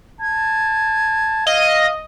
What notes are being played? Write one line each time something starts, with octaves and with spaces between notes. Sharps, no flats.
A5 G#6
D#5 F5